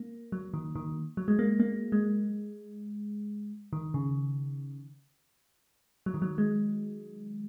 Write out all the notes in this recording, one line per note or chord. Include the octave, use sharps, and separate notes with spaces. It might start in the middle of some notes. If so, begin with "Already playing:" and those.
Already playing: A#3
F#3
D#3
D#3
F#3
G#3
A#3
A#3
G#3
D#3
C#3
F#3
D#3
F#3
G#3